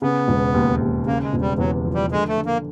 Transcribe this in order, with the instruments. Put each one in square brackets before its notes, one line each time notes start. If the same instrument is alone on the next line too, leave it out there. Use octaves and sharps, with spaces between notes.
[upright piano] C#3 [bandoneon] B3
[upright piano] E1
D#2
D#2
[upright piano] C#3 [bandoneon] A#3
[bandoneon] G#3
[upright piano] E1
[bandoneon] G3
[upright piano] E2 [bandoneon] F#3
[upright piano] F3
[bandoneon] G3
[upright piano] D3 [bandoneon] G#3
[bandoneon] A3
[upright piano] D3
[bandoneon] A#3